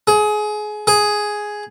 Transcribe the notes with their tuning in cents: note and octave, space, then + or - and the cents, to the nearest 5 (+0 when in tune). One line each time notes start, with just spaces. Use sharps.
G#4 +25
G#4 +5